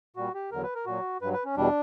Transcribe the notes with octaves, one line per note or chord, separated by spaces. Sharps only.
A#2 G3 F#4
G4
E2 D3 F#3 A#4
B4
A#4
A#2 F#3 F#4
G2 F#3 B4
B4
C#4
E2 B2 G3 D4